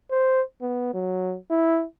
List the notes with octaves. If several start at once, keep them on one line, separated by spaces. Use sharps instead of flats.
C5
B3
F#3
E4